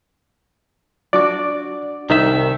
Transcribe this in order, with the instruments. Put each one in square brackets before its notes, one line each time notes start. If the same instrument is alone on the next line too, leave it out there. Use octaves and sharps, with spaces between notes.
[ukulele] D4 F#4 [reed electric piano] D5 D6
[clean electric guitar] C2 D#3 E5 [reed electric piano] D#4